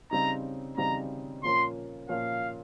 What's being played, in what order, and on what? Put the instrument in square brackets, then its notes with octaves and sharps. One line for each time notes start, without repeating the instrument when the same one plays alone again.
[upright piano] C#3 G3 C4 D#4 [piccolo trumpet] A#5
[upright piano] C#3 G3 C4 D#4 [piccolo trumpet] A#5
[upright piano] A#2 F3 A#3 C#4 [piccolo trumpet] C6
[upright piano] A#2 F3 A#3 C#4 [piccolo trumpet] F5